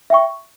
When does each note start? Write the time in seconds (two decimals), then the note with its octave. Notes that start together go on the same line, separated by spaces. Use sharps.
0.10 E5 G5 C#6